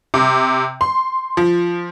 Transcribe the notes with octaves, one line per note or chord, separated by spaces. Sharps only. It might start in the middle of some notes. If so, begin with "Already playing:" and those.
C3
C6
F3